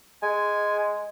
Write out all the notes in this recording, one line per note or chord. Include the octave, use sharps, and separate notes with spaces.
G#3 G#5